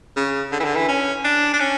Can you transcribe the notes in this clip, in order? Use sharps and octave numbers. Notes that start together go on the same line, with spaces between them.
C#3
D3
E3
D3
E3
C#4
D4
D4
C#4